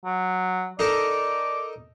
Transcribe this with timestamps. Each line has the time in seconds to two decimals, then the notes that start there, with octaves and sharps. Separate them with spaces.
0.05 F#3
0.79 D#4 A4 A#4 D5